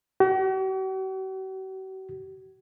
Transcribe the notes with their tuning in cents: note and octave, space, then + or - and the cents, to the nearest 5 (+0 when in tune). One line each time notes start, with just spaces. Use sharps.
F#4 +45